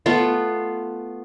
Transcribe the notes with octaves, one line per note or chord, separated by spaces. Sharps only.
A3 B3 F4